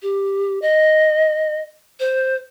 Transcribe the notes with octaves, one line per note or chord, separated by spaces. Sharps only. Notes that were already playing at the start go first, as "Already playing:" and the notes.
G4
D#5
C5